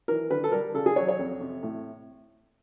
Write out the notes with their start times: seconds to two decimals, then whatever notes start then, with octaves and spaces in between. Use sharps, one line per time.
0.08 E3 A#4
0.30 D3 B4
0.44 A4
0.52 G3 A#4
0.74 C#3 A4
0.86 G#4
0.96 F#3 C#5
1.08 C#5
1.19 F2
1.41 C3
1.63 A2